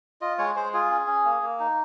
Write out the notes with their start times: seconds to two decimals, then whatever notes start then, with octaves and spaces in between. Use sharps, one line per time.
0.21 F4 D#5
0.38 G#3 C#5
0.56 G#3 C5
0.74 F4 G#4
0.90 C#4
1.07 C#4
1.25 A#3
1.42 A#3
1.59 D#4